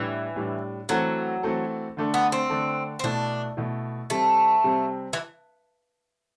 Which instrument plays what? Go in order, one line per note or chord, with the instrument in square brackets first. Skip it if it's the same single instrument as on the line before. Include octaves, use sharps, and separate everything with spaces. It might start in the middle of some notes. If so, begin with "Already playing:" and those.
Already playing: [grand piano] A2 G3 D4 [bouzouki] E3
[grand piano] A2 G3 D4
[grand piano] E3 A3 C4 F#4 A4 [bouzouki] F#3
[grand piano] E3 A3 C4 F#4 A4
D3 A3 D4 A4
[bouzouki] B3
C4
[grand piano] D3 A3 D4 A4
[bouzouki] C4
[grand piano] B2 A3 E4 [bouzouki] D4
[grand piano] B2 A3 E4
[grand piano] C3 G3 C4 [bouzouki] A3
[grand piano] C3 G3 C4
[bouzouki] E3